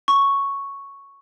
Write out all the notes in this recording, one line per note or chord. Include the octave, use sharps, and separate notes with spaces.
C#6